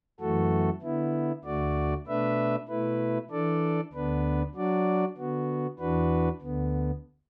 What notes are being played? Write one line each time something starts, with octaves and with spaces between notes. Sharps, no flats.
F#2 E3 A3 F#4 A4
D3 B3 E4
D2 D3 A3 F#4 D5
B2 A3 D4 B4 E5
B2 A3 E4 B4
E3 D4 A4 D5
D2 D3 B3 D4 B4
F#3 D4 F#4 D5
D3 B3 F#4
E2 E3 D4 F#4 B4
D2 D3 B3